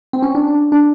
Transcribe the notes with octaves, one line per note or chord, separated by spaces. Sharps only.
C4
C#4
D4
D4
D4